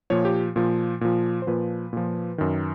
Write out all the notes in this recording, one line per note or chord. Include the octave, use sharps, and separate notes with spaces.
A#2 F3 C#5
G4
A#2 F3
A#2 F3
C5
A#2 F3 B4
A#2 F3
F#2 D#3